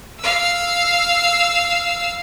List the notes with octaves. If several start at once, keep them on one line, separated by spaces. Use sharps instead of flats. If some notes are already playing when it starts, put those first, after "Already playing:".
F5 E6